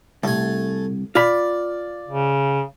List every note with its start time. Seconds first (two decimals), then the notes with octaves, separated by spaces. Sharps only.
0.23 C2 A3 G#5
1.15 F4 D5 B5
2.09 C#3